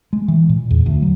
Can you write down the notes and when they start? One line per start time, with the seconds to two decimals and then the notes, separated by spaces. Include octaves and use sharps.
0.13 G#3
0.28 E3
0.49 A#2
0.71 E2
0.86 D2
1.02 F#3